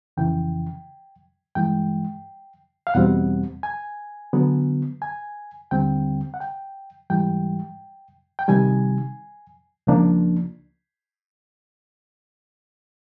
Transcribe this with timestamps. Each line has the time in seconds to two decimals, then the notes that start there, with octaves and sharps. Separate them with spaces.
0.17 F2 C#3 E3 G5
1.55 G2 E3 G#3 G5
2.87 F5
2.94 E2 B2 G3 C4 F#5
3.63 G#5
4.33 D3 F#3 B3
5.02 G#5
5.71 D#2 D3 G3 C4 G5
6.34 F#5
6.40 G5
7.10 G#2 E3 G3 G5
8.39 G5
8.48 C3 D#3 G3 G#5
9.87 C#2 C#3 F3 A#3 D4